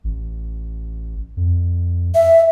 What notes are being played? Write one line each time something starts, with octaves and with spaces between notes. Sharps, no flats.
A1
F2
E5